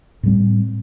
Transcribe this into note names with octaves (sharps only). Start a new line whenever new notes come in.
A2 G3 C4